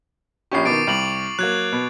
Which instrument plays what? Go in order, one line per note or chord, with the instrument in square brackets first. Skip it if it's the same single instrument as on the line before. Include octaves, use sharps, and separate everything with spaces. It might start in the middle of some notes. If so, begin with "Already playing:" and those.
[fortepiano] A#1 C#4 G4 [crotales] C#6 C7
[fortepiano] B2 D#3 [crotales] D6 A6 D7
[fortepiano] C2 [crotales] D7 F7 F#7
[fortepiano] F#3 A#3 [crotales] F#6 G#6
[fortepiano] B2